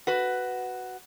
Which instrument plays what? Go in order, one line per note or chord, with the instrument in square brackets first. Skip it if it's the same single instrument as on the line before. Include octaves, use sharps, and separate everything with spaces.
[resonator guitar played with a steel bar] F#4 B4